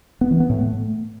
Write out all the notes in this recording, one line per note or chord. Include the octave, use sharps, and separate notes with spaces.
B3
E3
B3
A2
A3